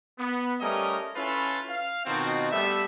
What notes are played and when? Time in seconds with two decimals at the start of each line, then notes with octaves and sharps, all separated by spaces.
0.19 B3
0.60 G3 A3 C#4 A#4 D#5
1.16 C#4 E4 F4 A4 B4
1.69 F5
2.05 B2 D#3 C4 F4 F#4
2.51 G3 A3 B3 E5